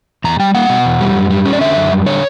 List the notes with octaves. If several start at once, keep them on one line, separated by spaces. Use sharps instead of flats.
E2 A#5
G3 G5
A#3 F#5
B2
E2
G3
F#2
G3
C#4
D5
D3 E5
F#2
G3
D3 C#5